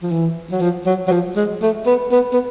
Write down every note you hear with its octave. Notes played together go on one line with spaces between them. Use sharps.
F3
E3
F#3
F3
F#3
F#3
F3
G#3
A3
B3
B3
B3